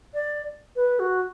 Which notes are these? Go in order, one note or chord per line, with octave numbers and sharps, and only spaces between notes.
D5
B4
F#4